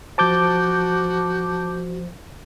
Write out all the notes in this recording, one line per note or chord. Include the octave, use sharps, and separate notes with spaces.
F3 F#4 C5 A5 D6 G6